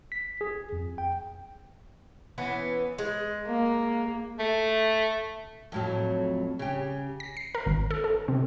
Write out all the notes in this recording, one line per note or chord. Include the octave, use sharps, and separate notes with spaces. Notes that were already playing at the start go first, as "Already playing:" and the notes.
B6
G#4
F2
G5
E3 B3 C#4
G#3
A#3
A3
F2 A2 F#3
C#3 G4
A#6
C7
A#4
G#1
A4
A4
C3